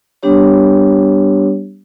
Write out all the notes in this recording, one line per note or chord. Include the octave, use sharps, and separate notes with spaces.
G3 B3 D4 G4 C#5